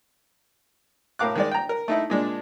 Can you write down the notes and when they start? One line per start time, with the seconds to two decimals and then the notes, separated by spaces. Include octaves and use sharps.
1.19 A2 A#4 F5 D6 F#6
1.36 D#3 G#3 D5
1.51 G5 A#5
1.69 A#4
1.88 A3 D#4 E4
2.10 A#2 G#3 D4